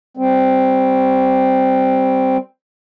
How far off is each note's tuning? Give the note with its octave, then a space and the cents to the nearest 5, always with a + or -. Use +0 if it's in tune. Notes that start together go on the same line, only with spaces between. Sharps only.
G3 +0 C4 +0